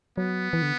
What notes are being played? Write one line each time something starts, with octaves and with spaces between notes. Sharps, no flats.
F#3 B3
E3
D3